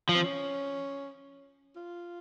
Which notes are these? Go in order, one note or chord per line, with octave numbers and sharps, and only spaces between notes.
F3
C4
C#4
F4